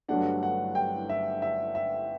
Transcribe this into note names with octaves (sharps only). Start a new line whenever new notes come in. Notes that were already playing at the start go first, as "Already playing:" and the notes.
G1 G2 F#3 A3 D4 F#5
F#5
G5
E5
E5
E5